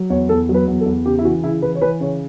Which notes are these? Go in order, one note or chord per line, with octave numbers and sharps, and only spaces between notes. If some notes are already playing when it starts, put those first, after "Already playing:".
Already playing: F#3
E2 C#5
E2 A4
F#3
B4
E2
A4
E2
C#3 G4
E4
E3 F#4
C#3 E4
E3 B4
C#5
E3 B4
C#3 C#5